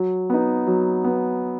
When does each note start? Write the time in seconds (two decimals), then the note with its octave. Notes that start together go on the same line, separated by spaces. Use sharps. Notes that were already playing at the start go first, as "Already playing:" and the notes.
Already playing: F#3
0.30 B3 D#4
0.67 F#3
1.04 B3